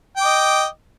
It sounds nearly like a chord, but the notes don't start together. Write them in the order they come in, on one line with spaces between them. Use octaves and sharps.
G5 D6 D#5